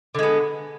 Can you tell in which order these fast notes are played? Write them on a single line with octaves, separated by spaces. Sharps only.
D3 G#3 B3